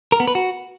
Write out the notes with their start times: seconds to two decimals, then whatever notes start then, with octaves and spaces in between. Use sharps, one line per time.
0.12 A#4
0.20 B3
0.28 B4
0.35 F#4